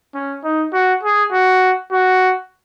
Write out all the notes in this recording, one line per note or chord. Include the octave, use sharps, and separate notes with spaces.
C#4
D#4
F#4
G#4
F#4
F#4